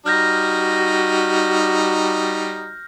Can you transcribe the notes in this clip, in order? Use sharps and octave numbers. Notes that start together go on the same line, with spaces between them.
G3 D#4 F#4 F6 G6 A#6